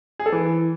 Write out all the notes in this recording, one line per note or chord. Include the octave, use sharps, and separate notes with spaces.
G#4
A4
E3